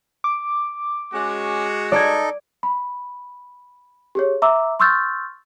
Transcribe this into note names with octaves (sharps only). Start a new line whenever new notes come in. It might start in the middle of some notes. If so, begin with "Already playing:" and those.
D6
G#3 C#4 F#4
D#4 A4 D5 D#5 G#6
B5
G4 G#4 C#5
E5 A#5 D6 E6
C6 C#6 E6 F6 G6 A6